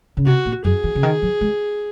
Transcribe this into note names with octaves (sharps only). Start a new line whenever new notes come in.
C#3
C3 F#4
A#2
F#2 G#4
D#3
C#3
D#3
F#3
G#3